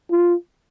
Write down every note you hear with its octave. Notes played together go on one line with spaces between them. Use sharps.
F4